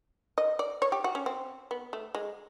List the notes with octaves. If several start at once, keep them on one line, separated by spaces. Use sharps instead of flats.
D#5
D5
C#5
G4
F#4
C#4
C4
B3
A3
G#3